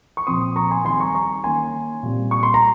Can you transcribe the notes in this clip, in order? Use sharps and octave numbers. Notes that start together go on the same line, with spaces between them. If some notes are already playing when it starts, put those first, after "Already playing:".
C#6
A#2 F3 C4 C6 D#6
A#5 C#6
G#5 C6
D#3 G3 C4 G#5 C6
A#5 C#6
A#5 C#6
D#3 A#3 C#4 G#5 C6
A#2 G3 C4
C#6
C6
A#5